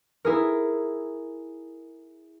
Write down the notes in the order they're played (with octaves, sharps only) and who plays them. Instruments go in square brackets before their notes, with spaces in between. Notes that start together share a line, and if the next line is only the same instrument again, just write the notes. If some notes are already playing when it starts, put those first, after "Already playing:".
[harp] E4 G#4 A#4